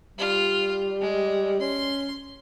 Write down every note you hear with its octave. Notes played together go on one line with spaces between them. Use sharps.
G3 F4
G#3
C#4 C6